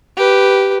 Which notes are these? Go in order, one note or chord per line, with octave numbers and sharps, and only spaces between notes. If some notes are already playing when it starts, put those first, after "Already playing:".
G4 B4